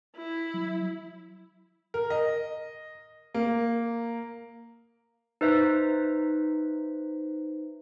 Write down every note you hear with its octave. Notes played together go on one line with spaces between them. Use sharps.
E4
F#3
A#4
D#5
A#3
D#4 B4 C5 E5